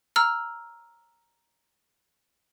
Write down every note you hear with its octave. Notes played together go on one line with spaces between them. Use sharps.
A#5 E6 F6